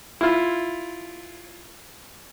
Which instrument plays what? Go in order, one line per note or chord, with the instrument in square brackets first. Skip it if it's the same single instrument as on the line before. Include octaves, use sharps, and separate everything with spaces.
[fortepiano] E4 F4